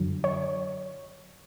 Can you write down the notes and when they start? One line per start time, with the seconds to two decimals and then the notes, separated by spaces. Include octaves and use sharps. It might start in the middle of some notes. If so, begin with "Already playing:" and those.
Already playing: F#2 D3 F#3
0.24 C#5